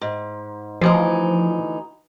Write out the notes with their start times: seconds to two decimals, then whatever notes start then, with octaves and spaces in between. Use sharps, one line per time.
0.01 G#2
0.81 D2 E3 F3 D#4